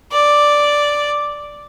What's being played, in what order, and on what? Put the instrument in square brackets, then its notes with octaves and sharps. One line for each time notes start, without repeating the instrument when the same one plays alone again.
[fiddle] D5